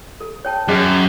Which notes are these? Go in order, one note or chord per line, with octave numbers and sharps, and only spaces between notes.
A4
C#5 G5 A5
F#2 G#4 D#5